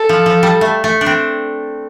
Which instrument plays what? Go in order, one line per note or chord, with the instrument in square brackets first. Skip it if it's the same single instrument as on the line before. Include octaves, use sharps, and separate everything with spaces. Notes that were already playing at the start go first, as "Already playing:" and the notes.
Already playing: [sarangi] A4
[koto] F3
F3
G3
A3
A3
D4
C4